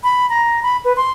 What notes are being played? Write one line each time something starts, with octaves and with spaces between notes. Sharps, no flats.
B5
A#5
B5
B4
C6